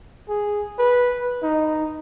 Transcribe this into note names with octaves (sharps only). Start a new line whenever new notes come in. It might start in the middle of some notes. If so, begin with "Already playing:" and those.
G#4
B4
D#4